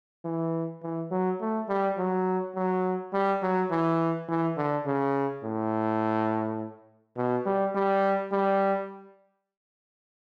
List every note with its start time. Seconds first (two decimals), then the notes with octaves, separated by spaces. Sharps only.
0.25 E3
0.83 E3
1.11 F#3
1.41 A3
1.69 G3
1.98 F#3
2.56 F#3
3.13 G3
3.42 F#3
3.71 E3
4.29 E3
4.57 D3
4.86 C#3
5.44 A2
7.17 B2
7.46 G3
7.75 G3
8.32 G3